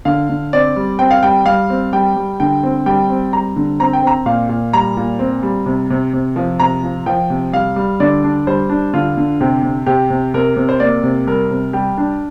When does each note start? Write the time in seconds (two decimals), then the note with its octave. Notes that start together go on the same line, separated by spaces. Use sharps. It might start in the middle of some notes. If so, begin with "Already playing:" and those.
0.05 D3 F5
0.29 D3
0.53 C4 D5
0.76 G3
0.99 C4 G5
1.11 F5
1.23 G3 G5
1.45 G3 F5
1.70 C4
1.93 G3 G5
2.16 G3
2.40 D3 G5
2.63 C4
2.86 G3 G5
3.09 C4
3.33 G3 A#5
3.56 D3
3.80 C4 A#5
3.93 G5
4.02 C4 A#5
4.26 A#2 F5
4.49 A#2
4.73 G3 A#5
4.97 A#2
5.19 C4
5.43 G3
5.66 C3
5.90 C3
6.13 C3
6.36 F3
6.59 C3 A#5
6.83 F3
7.06 F3 G5
7.30 C3
7.53 G3 F5
7.76 G3
8.00 D3 D5
8.24 D4
8.47 G3 C5
8.70 D4
8.94 D3 F4
9.17 D3
9.41 C3 G4
9.63 C3
9.86 C3 G4
10.10 C3
10.34 C3 A#4
10.57 C3
10.69 C5
10.80 A#3 D5
11.03 C3
11.27 G3 A#4
11.51 C3
11.73 G3 G4
11.98 D4